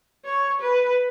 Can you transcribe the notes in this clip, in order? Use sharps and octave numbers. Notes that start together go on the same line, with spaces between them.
C#5
B4